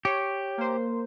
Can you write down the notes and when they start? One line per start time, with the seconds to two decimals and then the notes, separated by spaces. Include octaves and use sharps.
0.05 G4 C#5
0.58 A#3 C5